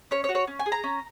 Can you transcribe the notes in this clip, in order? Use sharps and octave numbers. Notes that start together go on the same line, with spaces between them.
C#4 C#5
C#5
F#4
C#5
C#4
G#5
G#4
A#5
C#4